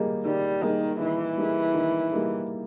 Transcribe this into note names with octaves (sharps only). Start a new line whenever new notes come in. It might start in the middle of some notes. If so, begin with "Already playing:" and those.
Already playing: D#3 G3 A#3 D#4 G#4
D#3 G3
D#3 G3 A#3 D#4 G#4
D#3 E3
G3 A#3 D#4 G#4
D#3
G3 A#3 D#4 G#4